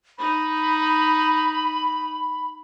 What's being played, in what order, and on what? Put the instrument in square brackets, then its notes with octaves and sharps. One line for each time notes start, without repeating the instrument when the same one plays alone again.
[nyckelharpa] D#4 [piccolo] B5